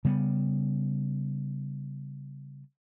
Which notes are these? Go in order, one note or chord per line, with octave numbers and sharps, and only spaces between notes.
C#3 G3 B3